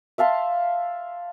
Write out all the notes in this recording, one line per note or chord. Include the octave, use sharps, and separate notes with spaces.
E5 F5 A5 C6